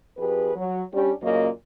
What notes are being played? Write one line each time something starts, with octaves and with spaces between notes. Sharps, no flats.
F2 G4 G#4 B4
F#3
G3 C#4 D4 G4
F#2 A#2 C#3 A#3 C#4 D#5